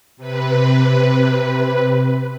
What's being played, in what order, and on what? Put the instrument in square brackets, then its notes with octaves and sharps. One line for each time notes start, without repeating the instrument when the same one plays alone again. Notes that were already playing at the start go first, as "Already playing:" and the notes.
[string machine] C3 B4